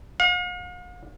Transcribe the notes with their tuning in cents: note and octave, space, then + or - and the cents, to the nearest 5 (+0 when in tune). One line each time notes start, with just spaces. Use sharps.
F5 +45